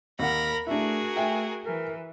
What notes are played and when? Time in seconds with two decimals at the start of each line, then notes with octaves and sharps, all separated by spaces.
0.19 D#2 A#4 F#5 B5 A#6
0.67 A3 D4 E4 F#4 G#4 A#4
1.16 A3 E5 G5 G#5
1.66 E3 A#4